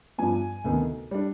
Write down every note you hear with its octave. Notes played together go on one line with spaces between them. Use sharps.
G2 F3 B3 G#5
D2 C3 D#3 B3 D#4
G3 D4